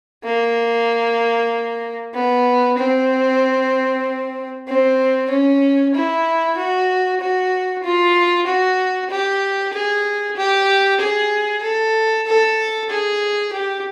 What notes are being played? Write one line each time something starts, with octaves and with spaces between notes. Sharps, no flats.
A#3
B3
C4
C4
C#4
E4
F#4
F#4
F4
F#4
G4
G#4
G4
G#4
A4
A4
G#4
G4